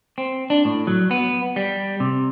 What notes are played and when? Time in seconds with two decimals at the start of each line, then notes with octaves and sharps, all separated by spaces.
0.18 C4
0.50 D4
0.65 A2
0.87 F#3
1.11 B3
1.56 G3
2.00 C3